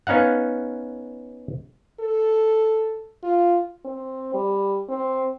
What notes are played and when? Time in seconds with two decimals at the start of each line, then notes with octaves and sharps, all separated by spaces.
0.07 B3 C#4 D#4 F5 F#5
2.00 A4
3.23 F4
3.85 C4
4.34 G3
4.89 C4